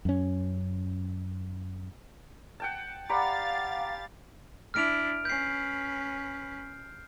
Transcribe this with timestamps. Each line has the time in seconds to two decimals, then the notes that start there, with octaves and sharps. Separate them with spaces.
0.05 F#2 C#4
2.60 F#5 G5 A5
3.09 G4 D5 F5 F#5 A#5 B5 A6
4.74 D4 E4 F6 D7 F7
5.25 C#4 B4 G6 C7